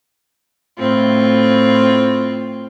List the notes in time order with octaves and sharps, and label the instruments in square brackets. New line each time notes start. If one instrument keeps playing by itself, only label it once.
[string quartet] A2 C4 F4